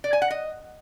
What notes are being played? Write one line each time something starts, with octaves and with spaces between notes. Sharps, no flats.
D5
G#5
F#5
D#5